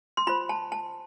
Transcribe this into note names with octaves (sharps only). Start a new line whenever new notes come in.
C6
F4 C5 B5
A5
A5